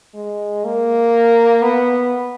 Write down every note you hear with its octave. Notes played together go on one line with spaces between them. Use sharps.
G#3
A#3
B3